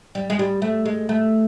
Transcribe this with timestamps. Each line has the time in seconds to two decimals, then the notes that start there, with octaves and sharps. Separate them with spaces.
0.15 G3
0.30 G#3
0.39 G3
0.62 A3
0.85 G#3
1.09 A3